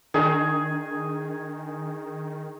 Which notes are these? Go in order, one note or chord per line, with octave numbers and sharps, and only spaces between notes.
D#3 D4 G#4